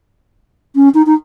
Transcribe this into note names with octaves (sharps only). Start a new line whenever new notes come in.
C#4
D#4
D#4